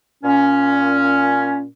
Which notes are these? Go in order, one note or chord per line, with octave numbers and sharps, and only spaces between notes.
A#2 C#4